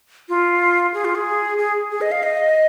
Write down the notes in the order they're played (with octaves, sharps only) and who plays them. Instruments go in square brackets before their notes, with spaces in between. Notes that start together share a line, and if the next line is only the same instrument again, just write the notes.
[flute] F4
G#4
F4
G#4
G#4
G#4
D#5
F5
D#5